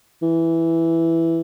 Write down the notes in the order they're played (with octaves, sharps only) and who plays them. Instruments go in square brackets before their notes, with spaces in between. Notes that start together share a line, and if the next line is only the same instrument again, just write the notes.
[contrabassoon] E3